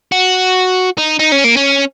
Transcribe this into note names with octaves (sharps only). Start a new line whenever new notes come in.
F#4
D#4
D#4
C#4
A#3
C#4